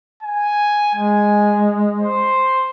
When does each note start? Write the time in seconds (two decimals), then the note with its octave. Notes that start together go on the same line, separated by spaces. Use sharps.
0.23 G#5
0.95 G#3 G#5
2.01 C5